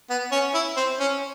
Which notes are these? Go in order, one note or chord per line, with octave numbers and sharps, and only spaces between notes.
B3
C#4
E4
C4
C#4